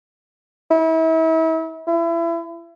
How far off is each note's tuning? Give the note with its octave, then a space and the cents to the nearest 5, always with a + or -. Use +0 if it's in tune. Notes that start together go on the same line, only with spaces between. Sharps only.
E4 -35
E4 +30